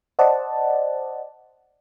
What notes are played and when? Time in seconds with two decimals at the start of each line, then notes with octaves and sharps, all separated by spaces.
0.19 C5 D5 D#5 F#5 A5